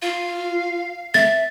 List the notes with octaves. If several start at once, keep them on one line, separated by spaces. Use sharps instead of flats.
F4 F5
E5 A6